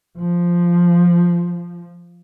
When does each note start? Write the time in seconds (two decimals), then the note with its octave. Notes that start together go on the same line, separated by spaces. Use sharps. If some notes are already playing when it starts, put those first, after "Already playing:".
0.17 F3